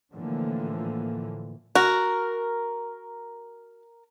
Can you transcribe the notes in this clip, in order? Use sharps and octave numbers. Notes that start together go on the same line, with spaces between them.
A2 D3 E3 F3 A#3
F#4 A#4